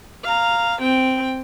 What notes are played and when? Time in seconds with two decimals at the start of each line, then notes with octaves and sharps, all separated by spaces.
0.23 F5 A#5
0.82 C4 G5